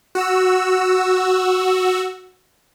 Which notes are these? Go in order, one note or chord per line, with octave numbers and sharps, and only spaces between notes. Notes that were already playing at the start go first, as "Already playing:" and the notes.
F#4 E6